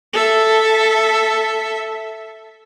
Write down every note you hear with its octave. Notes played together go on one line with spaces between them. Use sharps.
A4 E5